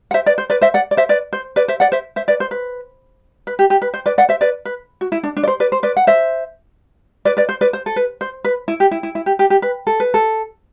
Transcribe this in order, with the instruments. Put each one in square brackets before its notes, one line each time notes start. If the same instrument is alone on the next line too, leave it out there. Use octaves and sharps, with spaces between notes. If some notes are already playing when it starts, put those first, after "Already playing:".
[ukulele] F#5
C5 E5
B4 D5
C5
B4 D5
C5 E5
D5 F#5
D5
C5 E5
B4 D5
C5
B4 D5
C5 E5
D5 F#5
C5 E5
C5 E5
B4 D5
C5
B4
B4
G4
G4
B4
C5
B4 D5
D5 F#5
C5 E5
B4 D5
B4
F#4
E4
D4
D4
D5
C5
B4 D5
C5
B4 D5
F#5
C5 E5
B4 D5
B4 D5
C5
B4 D5
C5
A4
B4
C5
B4
E4
G4
E4
E4
E4
G4
G4
G4
B4
A4
B4
A4